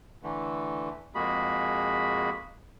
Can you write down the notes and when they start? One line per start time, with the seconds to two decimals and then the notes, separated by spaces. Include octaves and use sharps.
0.23 D3 E3 A3
1.15 F2 G#3 A#3 F#4 G#4 B5